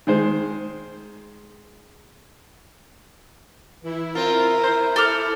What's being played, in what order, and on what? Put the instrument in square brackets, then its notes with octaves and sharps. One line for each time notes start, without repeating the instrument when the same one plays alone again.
[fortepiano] D#3 G#3 C5
[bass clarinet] E3 [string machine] E4
[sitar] C4 F4 [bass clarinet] A#4
[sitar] C5
[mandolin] A4 D6 F6